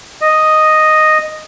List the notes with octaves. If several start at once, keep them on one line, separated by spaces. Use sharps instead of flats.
D#5